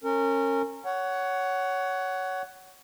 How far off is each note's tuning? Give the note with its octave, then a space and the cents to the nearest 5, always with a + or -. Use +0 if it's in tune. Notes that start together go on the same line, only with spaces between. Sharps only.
C#4 -25 A#4 -30
C#5 +15 F#5 +10